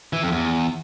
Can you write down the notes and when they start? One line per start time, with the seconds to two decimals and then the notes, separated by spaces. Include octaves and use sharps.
0.13 E3
0.23 F2
0.32 E2